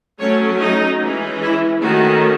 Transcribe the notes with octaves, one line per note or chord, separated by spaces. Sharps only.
F#3 A3 C#4 C#5
D#4
E3 G#3 C#4
E4
D#3 A3 C#4 F#4